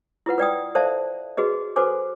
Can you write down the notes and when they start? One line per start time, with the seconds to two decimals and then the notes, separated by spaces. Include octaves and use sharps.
0.26 E4 F4 B4 F#5
0.38 B4 D5 G5 D#6
0.75 A4 C5 D5 E5 F5 A5
1.37 F#4 G#4 B4 D#5
1.76 F#4 A4 B4 C5 G#5 D6